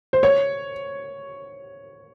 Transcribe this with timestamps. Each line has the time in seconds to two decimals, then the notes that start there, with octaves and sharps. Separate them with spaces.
0.13 C5
0.23 C#5